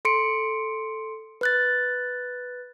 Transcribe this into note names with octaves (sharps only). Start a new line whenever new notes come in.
A4 C6 C#7 D7
B4 F#6 A6